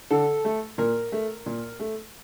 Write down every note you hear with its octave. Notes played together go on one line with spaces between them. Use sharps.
D3 A4
A3
A#2 A#4
A3
A#2
A3